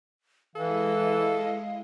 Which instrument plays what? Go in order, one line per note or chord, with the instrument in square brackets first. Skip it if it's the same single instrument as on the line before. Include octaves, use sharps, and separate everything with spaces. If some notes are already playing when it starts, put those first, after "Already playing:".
[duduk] E3 [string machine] G#3 E4 D#5 [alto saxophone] A4 [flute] F5